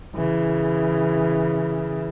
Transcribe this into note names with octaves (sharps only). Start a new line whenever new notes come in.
C#3 E3